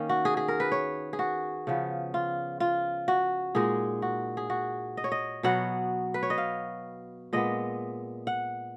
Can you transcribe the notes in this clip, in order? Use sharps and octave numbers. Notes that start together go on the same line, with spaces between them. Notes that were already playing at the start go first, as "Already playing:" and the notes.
Already playing: D#3 A#3 C#4
F#4
G#4
G#4
A#4
B4
C#5
G#4
F#4
C#3 F3 B3
F4
F4
F#4
A#2 G#3 D#4 G#4
F#4
G#4
F#4
D#5
C#5
D#5
B2 F#3 B3 F#5
B4
C#5
D#5
F5
A#2 G#3 B3 D#5
F#5